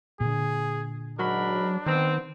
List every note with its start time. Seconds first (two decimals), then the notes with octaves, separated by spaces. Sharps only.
0.21 A#2 D3 G#4
1.19 G#2 F#3 D4 A#4 B5
1.86 D#3 B3 C4